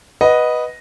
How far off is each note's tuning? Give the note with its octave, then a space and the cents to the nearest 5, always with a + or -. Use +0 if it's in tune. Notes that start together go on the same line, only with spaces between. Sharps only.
B4 -5 D#5 +0 F#5 +0